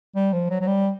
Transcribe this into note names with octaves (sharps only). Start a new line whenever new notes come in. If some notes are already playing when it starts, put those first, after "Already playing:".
G3
F3
F#3
F#3
G3